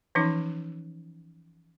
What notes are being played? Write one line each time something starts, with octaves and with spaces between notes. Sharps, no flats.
E3 F3 C#4 D#4